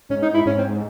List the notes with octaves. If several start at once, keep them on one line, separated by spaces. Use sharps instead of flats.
G#2 C#4
D#4
E4
G#2 C#4
C4